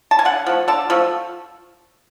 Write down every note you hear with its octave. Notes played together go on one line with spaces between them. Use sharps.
A5
G#5
D3 F#5
F3 A3
D3 A5
F3 A3